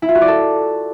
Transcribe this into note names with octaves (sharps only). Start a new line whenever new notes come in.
E4
F4
F#4
D5
A4